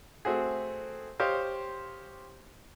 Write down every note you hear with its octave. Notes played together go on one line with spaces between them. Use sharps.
A3 C4 F#4 G#4
G4 C5 C#5 D#5 F5 G5